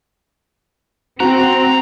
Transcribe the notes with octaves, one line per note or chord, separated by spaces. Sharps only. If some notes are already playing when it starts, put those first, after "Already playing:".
C4 F#4 A#5